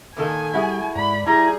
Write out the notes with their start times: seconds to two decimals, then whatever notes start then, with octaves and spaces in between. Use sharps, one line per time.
0.17 A#2 D#3 A4 G#5 D#6
0.53 G3 E4 F#4 G#4
0.95 G#2 D5 B5
1.27 G3 E4 G#4 A#5 G#6